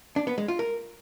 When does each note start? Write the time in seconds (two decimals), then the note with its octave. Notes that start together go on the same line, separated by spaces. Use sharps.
0.16 D4
0.27 B3
0.38 G#3
0.48 F4
0.59 A#4